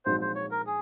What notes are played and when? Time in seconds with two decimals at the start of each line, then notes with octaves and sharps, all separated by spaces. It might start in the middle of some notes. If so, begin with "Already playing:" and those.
0.05 A#1 G#2 F#3 C4 C5
0.21 C5
0.35 C#5
0.51 A#4
0.67 G#4